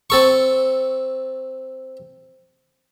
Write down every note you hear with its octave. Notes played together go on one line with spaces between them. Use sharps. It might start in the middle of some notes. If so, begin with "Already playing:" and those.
C4 A4 C#6